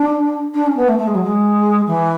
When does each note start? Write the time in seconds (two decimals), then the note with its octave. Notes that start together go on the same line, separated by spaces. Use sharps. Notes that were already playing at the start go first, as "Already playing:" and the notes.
Already playing: D4
0.54 D4
0.66 C#4
0.76 B3
0.88 A3
0.98 A3
1.07 G#3
1.14 F#3
1.23 G#3
1.86 E3